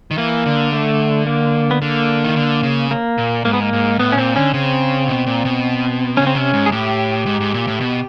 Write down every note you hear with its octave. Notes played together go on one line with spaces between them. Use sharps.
D#3
E3 A#3
D3
A3
A#3
B3
D3 A#3
D#3
D3
C#3
A#3
A#2
G#2 A#3
B3
A#3
G#2
A2 B3
C#4
A#2 C4
D3 C#4
C#3 C4
B2
A#2
B2
C#3 C#4
C4
C3 C#4
G#2
G#4
A2 G4
G#2
G#2
A#2
A2
B2